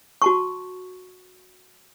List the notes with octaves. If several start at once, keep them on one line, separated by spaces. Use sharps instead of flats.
F#4 A5 C#6